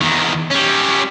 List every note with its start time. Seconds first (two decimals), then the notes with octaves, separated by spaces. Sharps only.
0.01 E2 D#3
0.50 G3 C#4